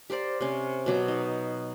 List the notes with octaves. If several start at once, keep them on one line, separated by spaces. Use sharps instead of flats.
G4 A#4 C5 D5
C3 C#4
B2 F#3 D6
D#4